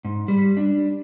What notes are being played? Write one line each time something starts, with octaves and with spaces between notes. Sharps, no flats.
G#2
G3
D4